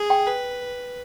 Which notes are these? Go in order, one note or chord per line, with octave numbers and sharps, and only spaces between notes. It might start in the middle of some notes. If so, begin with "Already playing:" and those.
Already playing: G#4
G5
B4